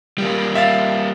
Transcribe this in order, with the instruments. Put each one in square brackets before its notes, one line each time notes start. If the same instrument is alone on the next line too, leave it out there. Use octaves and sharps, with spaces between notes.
[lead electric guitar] G3 A#3
[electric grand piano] E5 F5 A6